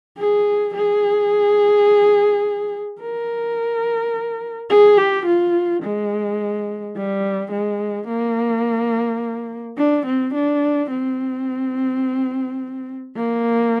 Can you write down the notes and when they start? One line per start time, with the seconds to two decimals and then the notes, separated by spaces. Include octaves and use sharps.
0.18 G#4
0.74 G#4
3.00 A#4
4.70 G#4
4.98 G4
5.26 F4
5.82 G#3
6.96 G3
7.51 G#3
8.08 A#3
9.77 D4
10.06 C4
10.34 D4
10.90 C4
13.16 A#3